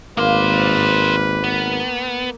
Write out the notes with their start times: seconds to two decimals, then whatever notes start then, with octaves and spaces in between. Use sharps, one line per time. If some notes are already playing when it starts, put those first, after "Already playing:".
0.17 G#1 G#3 A#3 B4 C5
1.44 B3